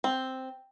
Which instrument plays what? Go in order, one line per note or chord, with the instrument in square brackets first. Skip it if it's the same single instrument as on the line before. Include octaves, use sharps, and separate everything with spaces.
[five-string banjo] C4